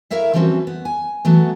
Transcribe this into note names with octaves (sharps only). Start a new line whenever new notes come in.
E4 A#4 C#5 E5 F5
E3 F3 G3 C4 C#4 F#4
B3
G#5
E3 F#3 A3 B3